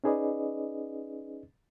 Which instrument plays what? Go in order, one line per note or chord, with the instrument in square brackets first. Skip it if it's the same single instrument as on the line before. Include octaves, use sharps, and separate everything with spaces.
[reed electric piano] C#4 D#4 G#4 B4 D5 D#5